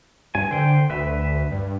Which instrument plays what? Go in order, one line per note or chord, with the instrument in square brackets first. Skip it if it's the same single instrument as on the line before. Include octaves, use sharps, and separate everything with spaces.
[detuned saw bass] G2 [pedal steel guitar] G#5
[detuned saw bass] D3 [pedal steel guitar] C5 G5
[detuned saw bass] D2 [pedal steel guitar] B4 E5
[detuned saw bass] G2